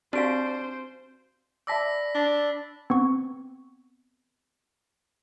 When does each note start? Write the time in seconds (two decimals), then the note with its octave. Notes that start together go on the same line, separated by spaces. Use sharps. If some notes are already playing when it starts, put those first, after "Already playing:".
0.13 C4 D4 F#4 G4 C5 F5 D7
1.67 D5 E5 A5 B5 D6 E6 A#6 B6
2.15 D4
2.90 B3 C4 C#6